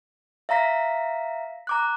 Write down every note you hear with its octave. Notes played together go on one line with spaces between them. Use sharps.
E5 F5 A#5 A#6 B6
A#5 D6 F#6